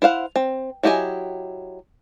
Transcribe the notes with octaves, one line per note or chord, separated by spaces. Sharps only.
E4 C5 F5 F#5
C4
F#3 E4 G4 D#5 G#5